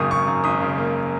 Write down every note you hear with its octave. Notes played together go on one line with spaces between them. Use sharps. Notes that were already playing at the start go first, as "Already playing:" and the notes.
Already playing: G#1 F#2 C#3 A#3 C#6 D#6
A#3 C#6
F#2
G#1 D#6
C#3
A#3